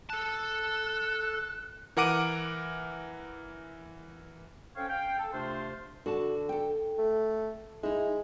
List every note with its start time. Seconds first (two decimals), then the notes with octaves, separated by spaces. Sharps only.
0.10 A4 A5 F#6
1.97 E3 A#4 F#5 D6 D7 D#7
4.76 C#4 A4 C5 C#5 F5 G5
4.90 F5 G5
5.19 A4
5.33 C3 A3 D4 F4 C5
6.06 D3 F#4 A5
6.49 A4 G5
6.98 A3
7.83 G#3 D#4 E4